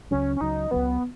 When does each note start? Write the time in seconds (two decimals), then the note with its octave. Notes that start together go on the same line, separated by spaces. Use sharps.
0.11 C#2 C#3 F#3 C#4
0.36 C#4
0.41 C#2 C#3 F#3 D#4
0.71 C#2 C#3 F#3 B3